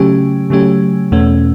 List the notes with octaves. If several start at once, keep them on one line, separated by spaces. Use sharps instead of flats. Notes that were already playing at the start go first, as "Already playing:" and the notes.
Already playing: C#3 F#3 A3 C#4 G4
C#3 F#3 A3 C#4 G4
E2 B2 A3 C#4